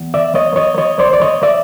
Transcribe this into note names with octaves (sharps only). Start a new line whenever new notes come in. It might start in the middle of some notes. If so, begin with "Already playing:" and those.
Already playing: E2
D5 E5
C#5 D#5
C#5 D#5
C#5 D#5
C5 D5
D5
C#5 D#5
D5 E5